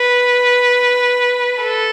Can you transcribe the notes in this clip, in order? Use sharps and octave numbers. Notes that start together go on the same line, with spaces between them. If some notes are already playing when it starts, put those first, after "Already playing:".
Already playing: B4
A4